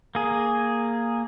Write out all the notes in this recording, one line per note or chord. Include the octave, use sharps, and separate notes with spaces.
A#3 G#4